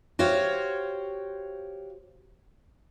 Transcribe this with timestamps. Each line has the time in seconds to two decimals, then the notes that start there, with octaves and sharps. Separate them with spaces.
0.19 F#4 G4 C5 C#5 F5